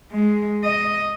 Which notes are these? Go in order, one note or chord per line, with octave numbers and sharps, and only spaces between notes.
G#3
D#5